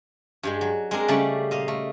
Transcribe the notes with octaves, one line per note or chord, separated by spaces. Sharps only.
G2 G3 G#3
F#3
G#3 C4 D4 A#4
C#3 G3 A3 D5 A5
A#2 D#5 F5
A3